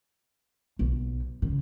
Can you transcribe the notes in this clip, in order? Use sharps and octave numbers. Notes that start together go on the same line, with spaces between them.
B1
C#3